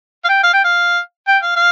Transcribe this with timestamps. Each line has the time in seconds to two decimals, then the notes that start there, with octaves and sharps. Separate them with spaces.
0.24 F5
0.29 G5
0.43 F5
0.53 G5
0.64 F5
1.27 G5
1.42 F5
1.56 F5